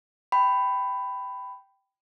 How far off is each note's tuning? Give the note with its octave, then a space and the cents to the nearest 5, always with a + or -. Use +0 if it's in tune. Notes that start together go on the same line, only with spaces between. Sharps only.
G5 -5 B5 +15